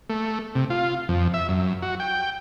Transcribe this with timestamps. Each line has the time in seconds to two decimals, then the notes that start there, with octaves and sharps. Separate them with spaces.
0.10 A3
0.55 C3
0.70 F4
1.09 F2
1.34 E5
1.49 F#2
1.82 F#4
2.00 G5